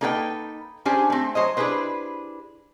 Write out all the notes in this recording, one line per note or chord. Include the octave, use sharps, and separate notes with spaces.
A#3 D#4 A4 B4 D5 G5
C#4 D4 G4 G#4 C5 G#5
A3 C4
F#3 C5 C#5 D#5
D4 E4 G4 G#4 B4 C5